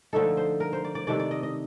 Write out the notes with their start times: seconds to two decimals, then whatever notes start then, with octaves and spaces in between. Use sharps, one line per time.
0.13 D3 F3 A3 D#4 A4
0.37 C5
0.60 A#4
0.73 C5
0.84 D5
0.95 D5
1.07 C3 D#3 A3 D4 D5
1.19 D5
1.31 D#5
1.43 D#5